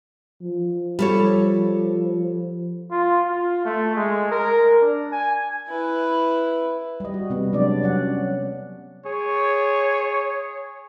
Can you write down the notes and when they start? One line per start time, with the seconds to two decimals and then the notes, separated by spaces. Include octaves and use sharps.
0.42 F3
0.99 G3 A4 C#5
2.91 F4
3.26 F4
3.65 A3
3.95 G#3
4.32 A#4
4.81 D4
5.12 G#5
5.69 E4 B4
7.00 G3 D#5
7.14 F#4
7.30 C3 G3 B3
7.53 F#3 G#3 D4 D5
7.83 F#3 C#4 F#5
9.05 G#4 C#5